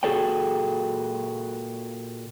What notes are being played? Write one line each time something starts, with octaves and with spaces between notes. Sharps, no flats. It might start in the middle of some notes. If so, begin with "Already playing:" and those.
A#2 F#4 G#4 A4 C#5 G5